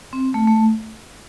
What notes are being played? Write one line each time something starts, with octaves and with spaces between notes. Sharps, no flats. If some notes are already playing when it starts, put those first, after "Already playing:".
C4
A3
A3